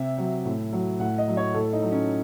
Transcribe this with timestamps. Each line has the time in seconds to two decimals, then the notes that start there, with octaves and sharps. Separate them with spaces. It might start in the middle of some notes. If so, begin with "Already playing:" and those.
Already playing: C3 E5
0.18 F#3
0.45 A2
0.73 F#3
1.00 A2 F#5
1.18 D#5
1.28 F#3
1.37 C#5
1.54 A2 A4
1.73 D#4
1.82 F#3
1.92 C#4